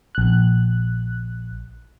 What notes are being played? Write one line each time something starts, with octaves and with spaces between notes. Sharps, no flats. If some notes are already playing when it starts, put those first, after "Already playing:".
A#1 F#6